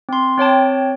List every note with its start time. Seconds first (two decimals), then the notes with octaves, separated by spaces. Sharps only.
0.09 C4 C6
0.38 C4 C#5 G5 A5